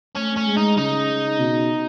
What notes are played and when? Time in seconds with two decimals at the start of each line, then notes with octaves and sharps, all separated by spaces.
0.16 A3 C#4
0.37 C#4
0.47 G#3
0.58 D#4
0.78 C#3 D#4
1.40 B2